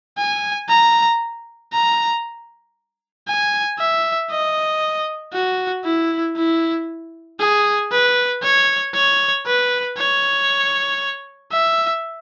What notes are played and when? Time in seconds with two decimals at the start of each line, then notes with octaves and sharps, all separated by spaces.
0.18 G#5
0.69 A#5
1.73 A#5
3.27 G#5
3.78 E5
4.30 D#5
5.33 F#4
5.85 E4
6.36 E4
7.39 G#4
7.91 B4
8.43 C#5
8.95 C#5
9.46 B4
9.98 C#5
11.52 E5